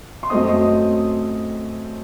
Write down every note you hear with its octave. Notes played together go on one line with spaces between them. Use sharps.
C6
F#2 F#3 A3 C4 D#5 D#6